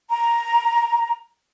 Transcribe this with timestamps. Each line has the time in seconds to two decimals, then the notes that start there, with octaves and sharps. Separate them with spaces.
0.09 A#5